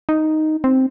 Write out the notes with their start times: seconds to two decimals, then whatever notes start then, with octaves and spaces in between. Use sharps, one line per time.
0.09 D#4
0.64 C4